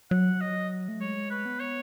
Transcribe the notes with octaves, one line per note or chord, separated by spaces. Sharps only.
F#3 F#5
D#5
A3
G#3 C#5
B4
B3
C#5